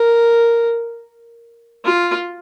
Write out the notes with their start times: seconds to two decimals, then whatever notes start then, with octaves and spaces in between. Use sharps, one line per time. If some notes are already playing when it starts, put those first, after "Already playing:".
Already playing: A#4
1.85 F4